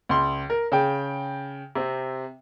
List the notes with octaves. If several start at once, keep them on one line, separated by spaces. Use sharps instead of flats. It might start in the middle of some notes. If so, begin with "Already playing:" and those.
C#2 C6
A#4
C#3 G5
C3 C4